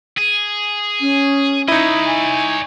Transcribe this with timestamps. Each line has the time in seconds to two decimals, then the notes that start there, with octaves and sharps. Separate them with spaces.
0.18 G#4
1.01 C#4
1.68 D#4 E4 C#5 D#5
2.07 G#5